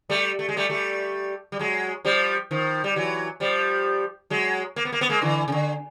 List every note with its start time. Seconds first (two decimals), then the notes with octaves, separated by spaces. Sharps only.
0.09 G3 A3
0.39 A3
0.49 G#3
0.57 G3 A3
0.69 G3 A3
1.52 G3
1.59 F#3 G#3
2.05 F3 G3
2.51 D#3 F3
2.84 G3
2.96 E3 F#3
3.40 F3 G3
4.30 F#3 G#3
4.76 A#3
4.85 B3
4.92 A#3
5.01 B3
5.09 G#3 A#3
5.22 D3 E3
5.48 C#3
5.52 D3